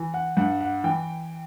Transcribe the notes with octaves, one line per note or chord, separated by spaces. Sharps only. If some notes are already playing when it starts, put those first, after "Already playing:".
Already playing: E3
F#5
G2 F#5
F#5
E3 G5